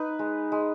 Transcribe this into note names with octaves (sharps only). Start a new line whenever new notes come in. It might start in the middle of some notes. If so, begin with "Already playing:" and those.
Already playing: D#4 B4
G#3
G#3